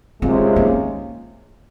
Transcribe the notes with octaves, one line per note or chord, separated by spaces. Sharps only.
C3 D#3 G#3 C4 C#4 F4
A#3